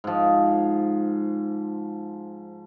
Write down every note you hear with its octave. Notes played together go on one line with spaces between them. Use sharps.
G#2 F3